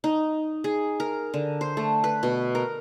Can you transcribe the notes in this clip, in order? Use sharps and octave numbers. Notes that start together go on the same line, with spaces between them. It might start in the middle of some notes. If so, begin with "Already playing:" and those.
D#4
G#4
A#4
D3
C5
A3
B4
B2
A#4